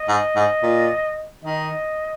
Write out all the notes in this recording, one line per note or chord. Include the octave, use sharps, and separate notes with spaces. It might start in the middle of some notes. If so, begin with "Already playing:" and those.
Already playing: D#5
G#2
G#2
A#2
D#3 D#5